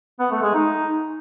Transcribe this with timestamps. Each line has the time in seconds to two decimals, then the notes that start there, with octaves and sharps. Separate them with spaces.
0.20 B3
0.31 A3
0.43 G#3
0.54 D#4